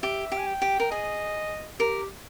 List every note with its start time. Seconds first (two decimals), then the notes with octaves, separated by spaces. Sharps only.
0.03 G4 E5
0.32 G4
0.38 G#5
0.47 G5
0.62 G4
0.80 A#4
0.91 G#4 D#5
1.80 G4 A#4